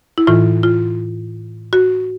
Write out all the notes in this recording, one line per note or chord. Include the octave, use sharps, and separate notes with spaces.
E4
A2 E3 F4
F4
F#4